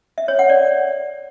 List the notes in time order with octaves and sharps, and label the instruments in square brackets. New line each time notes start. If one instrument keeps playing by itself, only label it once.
[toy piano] E5
C#5
F#5
D5